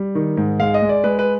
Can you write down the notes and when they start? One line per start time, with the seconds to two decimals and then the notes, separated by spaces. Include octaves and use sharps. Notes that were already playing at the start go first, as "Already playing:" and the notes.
Already playing: G3
0.15 D#3
0.37 G#2
0.60 G#3 F5
0.74 D#5
0.82 G#3
0.89 D5
1.04 G#3 B4
1.19 B4